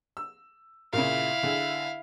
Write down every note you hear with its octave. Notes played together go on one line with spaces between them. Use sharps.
E6
A#2 C#3 E4 F5
D3 G#4